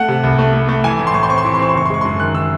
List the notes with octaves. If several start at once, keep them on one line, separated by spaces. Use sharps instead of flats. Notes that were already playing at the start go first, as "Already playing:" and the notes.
Already playing: A3 F#5
C3
C2
A3
A3
A3
E3 G#5
A2
C6
A2 C#6
C6
C4 C#6
C6
E3 C#6
C6
C4 C#6
C6
F#1 C#6
C6
G#3 C#6
C6
F#2
D#3 F#6
D#3 E6